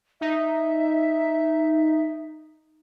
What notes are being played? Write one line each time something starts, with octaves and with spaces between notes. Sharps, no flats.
D#4 E5